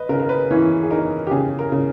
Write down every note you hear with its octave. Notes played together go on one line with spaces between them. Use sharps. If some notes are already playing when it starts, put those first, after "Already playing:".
Already playing: B4 D#5
C#3 A#4
A#4
B4
E3 C#4
G#4
D#4 A#4
G4
C#3 G#4
A#4
C#3